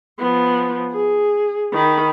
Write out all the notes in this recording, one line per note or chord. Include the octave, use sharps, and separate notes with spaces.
F3 B3
G#4
D#3 B5